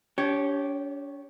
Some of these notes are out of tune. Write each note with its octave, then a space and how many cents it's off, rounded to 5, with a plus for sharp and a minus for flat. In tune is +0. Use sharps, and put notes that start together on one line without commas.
D4 -45 G4 -10 C#5 -5